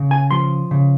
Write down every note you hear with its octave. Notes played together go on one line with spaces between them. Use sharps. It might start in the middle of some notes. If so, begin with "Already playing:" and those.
Already playing: C#3
G#5
F3 C6
C#3